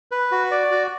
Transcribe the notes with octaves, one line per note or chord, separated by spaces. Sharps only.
B4
F#4
D5
F#4